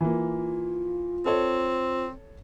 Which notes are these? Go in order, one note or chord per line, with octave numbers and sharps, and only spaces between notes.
E3 A#3 F4
C4 A4 C#5